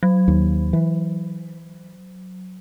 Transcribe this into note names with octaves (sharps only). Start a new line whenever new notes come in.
F#3
D#2
E3